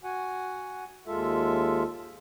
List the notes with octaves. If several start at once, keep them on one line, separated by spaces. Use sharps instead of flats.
F#4 F#5 G#5
D#2 G#3 F4 A4 E5